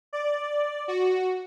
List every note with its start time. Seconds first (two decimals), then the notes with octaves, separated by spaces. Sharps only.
0.13 D5
0.88 F#4